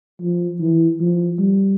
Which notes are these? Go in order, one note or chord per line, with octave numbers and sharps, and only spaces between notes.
F3
E3
F3
G3